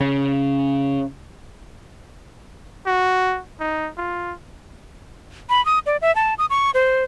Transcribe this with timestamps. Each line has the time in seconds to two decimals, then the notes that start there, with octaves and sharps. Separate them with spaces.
0.01 C#3
2.87 F#4
3.60 D#4
3.97 F4
5.49 B5
5.65 D#6
5.86 D5
6.02 E5
6.16 A5
6.38 D#6
6.50 C#6
6.74 C5